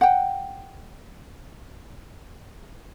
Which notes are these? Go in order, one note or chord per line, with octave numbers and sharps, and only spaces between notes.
F#5 G5